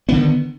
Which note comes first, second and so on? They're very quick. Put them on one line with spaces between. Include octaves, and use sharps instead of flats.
B3 D3 D#3